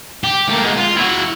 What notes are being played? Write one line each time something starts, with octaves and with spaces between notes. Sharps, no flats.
G4
A3 A#3
G#3 B3
F4
E4 F#4